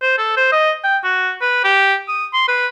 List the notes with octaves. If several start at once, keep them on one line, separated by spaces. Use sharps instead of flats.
C5
A4
C5
D#5
G5
F#4
B4
G4
D#6
C6
B4